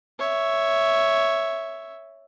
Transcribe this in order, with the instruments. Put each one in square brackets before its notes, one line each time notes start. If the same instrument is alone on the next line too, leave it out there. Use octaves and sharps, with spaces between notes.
[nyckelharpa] C#5 E5